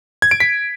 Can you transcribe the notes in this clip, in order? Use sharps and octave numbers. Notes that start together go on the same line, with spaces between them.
G#6
D7
B6